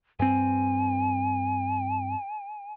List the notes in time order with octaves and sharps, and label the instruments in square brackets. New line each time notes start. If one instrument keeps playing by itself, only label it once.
[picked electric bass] G2 C4 [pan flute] G#5